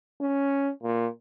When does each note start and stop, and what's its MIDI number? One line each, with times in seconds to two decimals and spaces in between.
0.21 0.72 61
0.83 1.07 46